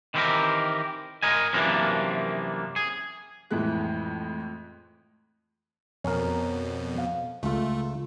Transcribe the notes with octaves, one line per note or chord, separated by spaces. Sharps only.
D#3 E3 B3 C4 G4 A#4
A#4 D#5 G#5
F#2 C3 E3 F3 A#3 D4
G#4
F2 A2 E3 G#3 F#6
F2 B2 C#4 A#4
F5
C#2 A3 F4